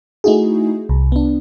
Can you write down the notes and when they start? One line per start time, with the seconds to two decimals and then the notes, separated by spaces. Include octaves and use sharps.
0.24 A3 D#4 E4 F#4 G#4
0.89 C2
1.12 B3 D4